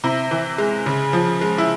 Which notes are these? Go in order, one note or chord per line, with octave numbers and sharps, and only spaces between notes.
C3 E4
E3
G#3
C#3
F3
G#3
E4